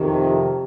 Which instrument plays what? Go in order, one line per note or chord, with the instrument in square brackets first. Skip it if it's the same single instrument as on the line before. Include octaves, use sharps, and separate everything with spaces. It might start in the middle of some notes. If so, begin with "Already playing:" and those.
Already playing: [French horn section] F2 C3 D#3 [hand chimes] G4